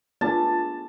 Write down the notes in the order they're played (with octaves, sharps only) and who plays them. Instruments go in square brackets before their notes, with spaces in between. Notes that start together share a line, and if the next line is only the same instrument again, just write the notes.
[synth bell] B3 D4 F4 [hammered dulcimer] A5